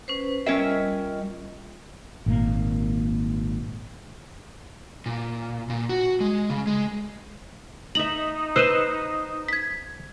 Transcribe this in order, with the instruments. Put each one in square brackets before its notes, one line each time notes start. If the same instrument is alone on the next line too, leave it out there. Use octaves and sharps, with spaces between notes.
[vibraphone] C#4 B4 C5
[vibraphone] G3 F4 D#5 [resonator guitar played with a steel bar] C#4 A#4 E5
[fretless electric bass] G#1 A#2 A#3
[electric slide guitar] A#2
A#2
F#4
G#3
C#3
G#3
[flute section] D#4 [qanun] E5 A#5 [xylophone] F#7
[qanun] B4 [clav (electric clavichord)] C5 [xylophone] E6 D#7 E7
[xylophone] G#6 B6